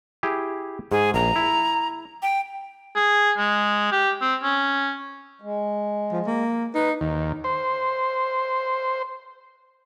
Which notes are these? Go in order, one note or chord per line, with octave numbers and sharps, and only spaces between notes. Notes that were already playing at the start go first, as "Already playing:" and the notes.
E4 G4 G#4
G#2 G#4
A#1 A#5
E4
G5
G#4
G#3
G4
C4
C#4
G#3
F3
A#3
D#4 B4
D#2
C5